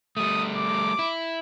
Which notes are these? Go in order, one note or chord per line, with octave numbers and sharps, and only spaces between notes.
G3 A3 D#6
D6
E4